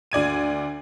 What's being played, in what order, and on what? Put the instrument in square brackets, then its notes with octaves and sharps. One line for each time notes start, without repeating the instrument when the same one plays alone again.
[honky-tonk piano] D2 D5 G#6 D#7